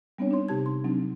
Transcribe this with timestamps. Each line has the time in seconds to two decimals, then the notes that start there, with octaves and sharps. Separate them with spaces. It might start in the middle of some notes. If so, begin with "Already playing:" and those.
0.18 G3 B3 C4 D4 C#5
0.31 D4 D#4 C#5 C6
0.49 C3 D#4 G4 A5 G#6
0.66 C6
0.84 F#3 C4 D4 D#4